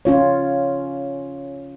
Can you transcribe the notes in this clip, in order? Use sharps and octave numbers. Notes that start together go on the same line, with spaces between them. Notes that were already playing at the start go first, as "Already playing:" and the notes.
C#4 F4 C#5